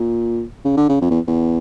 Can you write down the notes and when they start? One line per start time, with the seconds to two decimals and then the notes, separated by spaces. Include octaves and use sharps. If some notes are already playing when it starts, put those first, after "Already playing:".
Already playing: A#2
0.65 C#3
0.77 D3
0.89 C#3
1.01 F2
1.11 E2
1.27 E2